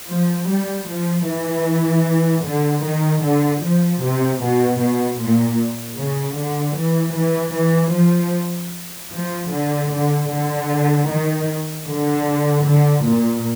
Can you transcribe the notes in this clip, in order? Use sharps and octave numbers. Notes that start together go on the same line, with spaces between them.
F3
G3
F3
E3
D3
D#3
D3
F3
C3
B2
B2
A#2
C#3
D3
E3
E3
E3
F3
F3
D3
D3
D3
D#3
D3
D3
A#2